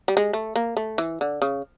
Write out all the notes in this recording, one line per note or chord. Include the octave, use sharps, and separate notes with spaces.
G3
G#3
A3
A#3
A3
E3
D3
C#3